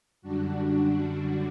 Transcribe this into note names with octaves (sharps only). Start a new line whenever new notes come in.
F#2 D3 G3 D4 F#4